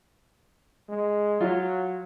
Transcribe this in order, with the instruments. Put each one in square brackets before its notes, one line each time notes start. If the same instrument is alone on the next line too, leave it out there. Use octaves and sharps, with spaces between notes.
[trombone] G#3
[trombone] F#3 [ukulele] F4